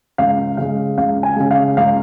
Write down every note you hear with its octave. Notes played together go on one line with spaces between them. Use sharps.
C#2 F5
C#3 G#3 F5
C#2 F5
G#5
C#3 G#3
F5
C#2 F5